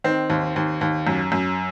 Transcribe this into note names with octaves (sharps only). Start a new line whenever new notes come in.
D#3 C4
D#2
D#2
D#2
F#2
F#2